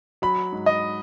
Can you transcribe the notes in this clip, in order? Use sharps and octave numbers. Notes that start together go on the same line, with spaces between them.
F#3 B5
G#2
D#5